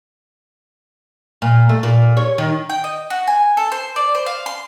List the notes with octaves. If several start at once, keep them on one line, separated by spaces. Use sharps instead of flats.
A#2
A3
A#2
C#5
D#3
G5
D#5
F#4
G#5
A4
C5
D5
C5
F5
C6